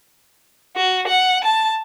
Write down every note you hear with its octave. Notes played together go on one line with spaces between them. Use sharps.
F#4
F#5
A5